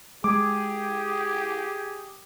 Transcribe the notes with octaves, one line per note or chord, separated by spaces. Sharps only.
G#3 G4 G#4 D6